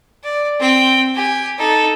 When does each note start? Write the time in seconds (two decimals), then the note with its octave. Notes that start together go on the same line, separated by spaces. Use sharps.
0.24 D5
0.60 C4 G5
1.15 G4 G#5
1.58 D#4 A4